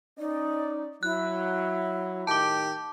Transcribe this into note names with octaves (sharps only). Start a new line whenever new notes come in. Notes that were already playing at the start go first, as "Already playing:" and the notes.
C#4 D#4 D5
F#3 E4 F#6
A2 D#3 G4 A5 D6